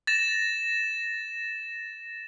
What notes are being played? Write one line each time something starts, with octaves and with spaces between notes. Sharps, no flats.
A6 A#6 E7